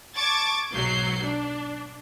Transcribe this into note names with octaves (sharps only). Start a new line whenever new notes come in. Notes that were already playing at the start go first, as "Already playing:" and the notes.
A5 C#6 D6 G#6 A6
B1 G#2 F#3 G6 C7
D4